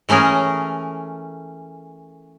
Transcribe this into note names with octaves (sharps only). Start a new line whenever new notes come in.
E3 A3 C#4 G#4 A#4